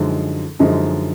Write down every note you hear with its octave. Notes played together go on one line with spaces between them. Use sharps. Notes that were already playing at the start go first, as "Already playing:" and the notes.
Already playing: F#2 D3 F3 G#3 D#4
F#2 D3 F3 G#3 D#4